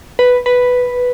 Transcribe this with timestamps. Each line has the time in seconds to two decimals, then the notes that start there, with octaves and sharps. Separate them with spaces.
0.19 B4
0.46 B4